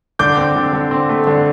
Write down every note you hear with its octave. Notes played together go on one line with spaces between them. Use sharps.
D3 D6 G6
C4
D3
D3
C4
A3
D3